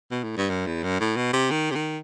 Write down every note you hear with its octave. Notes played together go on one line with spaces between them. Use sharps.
B2
A2
G2
F#2
E2
F#2
A2
B2
C3
D#3
C3
D#3